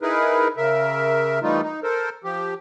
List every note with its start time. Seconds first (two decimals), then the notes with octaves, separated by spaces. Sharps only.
0.02 D#4 E4 G#4 A#4 B4
0.57 C#3 A#4 E5
1.43 D#3 E3 G3 A3 D#4 F4
1.63 D#4
1.83 A4 A#4 C5
2.24 F3 G4